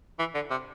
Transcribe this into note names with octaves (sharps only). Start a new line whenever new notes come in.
E3
D3
C3